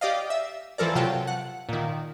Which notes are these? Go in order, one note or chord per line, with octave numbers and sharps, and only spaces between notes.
G4 D5 D#5 F5
E5
E3 F3 A4 A#4 D5
C3 F#3 F4 G5 A5
F#5
A#2 D#3